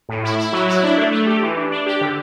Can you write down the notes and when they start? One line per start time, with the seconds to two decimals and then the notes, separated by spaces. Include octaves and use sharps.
0.09 A2
0.23 E4
0.39 E4
0.53 F#3
0.68 E4
0.83 D4
0.98 A3
1.12 A3
1.26 G4
1.42 E3
1.57 D4
1.72 D4
1.86 G4
2.01 D3